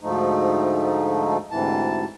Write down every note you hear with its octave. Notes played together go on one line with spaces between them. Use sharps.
D2 G#2 F3 A3 D#4
D2 G#2 C3 E3 A5